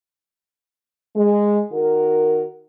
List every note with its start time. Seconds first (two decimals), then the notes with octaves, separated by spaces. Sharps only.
1.15 G#3
1.72 D#3 F#4 A#4